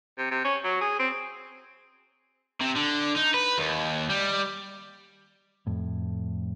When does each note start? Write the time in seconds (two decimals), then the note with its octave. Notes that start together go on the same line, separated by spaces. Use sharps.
0.18 C3
0.31 C3
0.45 C#4
0.64 F#3
0.81 G#4
0.99 C4
2.61 C3
2.76 D3
3.16 D#4
3.34 B4
3.58 D#2
4.10 G3
5.67 F2 A2